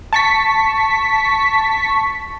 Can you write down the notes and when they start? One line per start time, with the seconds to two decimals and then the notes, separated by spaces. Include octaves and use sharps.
0.13 A5 C#6 B6